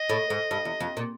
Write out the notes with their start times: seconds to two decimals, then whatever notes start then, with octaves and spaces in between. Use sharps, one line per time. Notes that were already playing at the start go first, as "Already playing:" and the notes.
Already playing: D#5
0.09 A2
0.30 G#2
0.51 G2
0.65 E2
0.80 F2
0.97 A#2